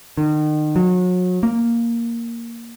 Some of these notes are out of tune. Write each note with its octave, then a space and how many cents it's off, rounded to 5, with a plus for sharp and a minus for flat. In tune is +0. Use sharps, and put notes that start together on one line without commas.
D#3 -35
F#3 -30
A#3 +0